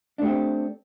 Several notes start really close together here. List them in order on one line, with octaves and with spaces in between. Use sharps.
D4 A3 G4 C4